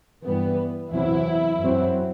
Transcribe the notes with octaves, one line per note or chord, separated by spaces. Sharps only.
G2 E3 G3 B3
E2 C3 F#3 E4
F#2 F#3 C4